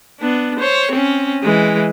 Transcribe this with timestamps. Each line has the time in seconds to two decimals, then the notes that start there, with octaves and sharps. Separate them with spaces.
0.20 B3 D4
0.60 C5 C#5
0.92 C4 C#4
1.43 E3 G#3